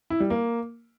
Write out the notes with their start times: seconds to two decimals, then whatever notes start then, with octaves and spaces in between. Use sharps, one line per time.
0.10 E4
0.20 G3
0.30 A#3